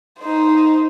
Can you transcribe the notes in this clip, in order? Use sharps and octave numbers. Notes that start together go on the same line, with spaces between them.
D#4 C5